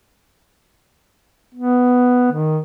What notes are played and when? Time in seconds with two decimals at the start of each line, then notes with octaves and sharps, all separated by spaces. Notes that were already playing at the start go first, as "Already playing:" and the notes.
1.55 B3
2.32 D#3